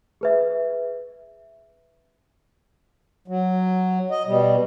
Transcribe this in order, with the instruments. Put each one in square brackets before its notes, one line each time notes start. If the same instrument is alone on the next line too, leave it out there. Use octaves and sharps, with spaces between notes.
[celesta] G#4 B4 E5
[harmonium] F#3
D#5
B2 G3